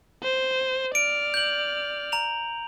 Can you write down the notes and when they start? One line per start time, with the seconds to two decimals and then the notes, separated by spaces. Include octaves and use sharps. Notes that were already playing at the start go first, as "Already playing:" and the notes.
0.23 C5
0.95 D5 F6 D7
1.34 G6 F#7
2.12 A#5 F7